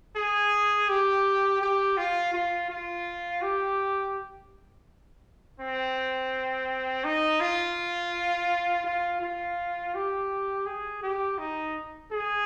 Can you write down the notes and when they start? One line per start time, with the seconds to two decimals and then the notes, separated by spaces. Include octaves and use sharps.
0.16 G#4
0.89 G4
1.61 G4
1.97 F4
2.34 F4
2.70 F4
3.42 G4
5.60 C4
7.04 D#4
7.41 F4
8.85 F4
9.21 F4
9.95 G4
10.66 G#4
11.03 G4
11.38 D#4
12.11 G#4